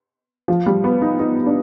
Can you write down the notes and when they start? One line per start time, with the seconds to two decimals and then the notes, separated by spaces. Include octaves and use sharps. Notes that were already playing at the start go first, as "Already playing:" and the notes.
0.48 F3
0.66 G3
0.84 B3
1.02 D#4
1.19 D#4
1.46 D4